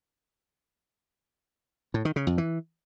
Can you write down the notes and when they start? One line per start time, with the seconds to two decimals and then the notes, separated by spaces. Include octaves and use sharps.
1.94 A2
2.05 D#3
2.16 C#3
2.27 F2
2.38 E3